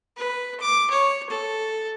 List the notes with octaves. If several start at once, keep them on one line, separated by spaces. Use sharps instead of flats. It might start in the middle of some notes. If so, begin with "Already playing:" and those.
B4
D6
C#5
A4